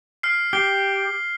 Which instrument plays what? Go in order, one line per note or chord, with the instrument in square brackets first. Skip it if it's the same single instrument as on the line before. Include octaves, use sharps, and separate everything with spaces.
[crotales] F6 C7
[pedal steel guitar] G4 [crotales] C7 G7